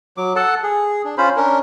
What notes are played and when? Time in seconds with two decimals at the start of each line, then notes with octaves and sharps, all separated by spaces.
0.17 F#3 D6
0.36 A4 F#5 A5
0.63 G#4
1.04 D4
1.17 C#4 F4 C5 B5
1.37 C#4 D4 A#4